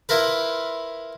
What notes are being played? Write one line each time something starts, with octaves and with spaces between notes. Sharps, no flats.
E4 F4 A#4 B4